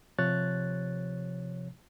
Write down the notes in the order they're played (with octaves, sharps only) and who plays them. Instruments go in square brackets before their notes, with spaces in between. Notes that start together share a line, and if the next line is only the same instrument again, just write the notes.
[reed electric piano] C3 F3 C#5 F#6 A6